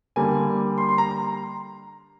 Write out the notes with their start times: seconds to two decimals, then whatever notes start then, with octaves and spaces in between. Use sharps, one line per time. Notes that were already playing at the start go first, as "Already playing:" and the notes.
0.16 D3 G3 A#3 G#5
0.78 C6
0.89 C6
0.98 A#5